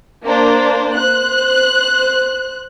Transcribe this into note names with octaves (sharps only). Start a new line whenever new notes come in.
A#3 D4 C5
C5 F#6